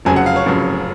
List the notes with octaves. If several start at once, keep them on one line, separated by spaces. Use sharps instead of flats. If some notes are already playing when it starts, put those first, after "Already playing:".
F1 F2 C#3 F#3 G#5
F#5
F5
C#5
F1 F2 C#3 F#3